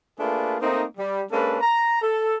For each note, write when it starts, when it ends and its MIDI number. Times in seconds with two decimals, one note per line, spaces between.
0.19 0.56 57
0.19 0.56 58
0.19 0.56 62
0.19 0.56 65
0.19 0.56 68
0.19 0.56 71
0.62 0.84 57
0.62 0.84 58
0.62 0.84 60
0.62 0.84 63
0.98 1.22 55
1.32 1.58 56
1.32 1.58 58
1.32 1.58 61
1.32 1.58 62
1.32 1.58 69
1.32 1.58 71
1.61 1.99 82
2.01 2.36 69